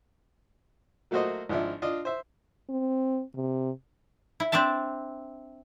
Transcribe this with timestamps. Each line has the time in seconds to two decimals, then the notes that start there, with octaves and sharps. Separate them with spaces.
1.11 F#3 A3 A#3 F#4 C5 D#5
1.49 G#1 F3 D4 E4
1.82 D4 F4 D#5
2.05 C5 E5
2.69 C4
3.35 C3
4.40 E4
4.52 C4 D4 D5 E5 A5